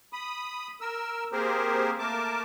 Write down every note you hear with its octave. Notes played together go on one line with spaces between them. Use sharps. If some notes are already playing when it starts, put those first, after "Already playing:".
B5 D#6
A#4 E6
A#3 C4 G4 G#4 A#4 C5
A3 A#3 A#4 A5 D6